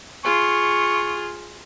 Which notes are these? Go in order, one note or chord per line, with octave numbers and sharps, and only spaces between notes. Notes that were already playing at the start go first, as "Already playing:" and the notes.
F4 G#4 C#6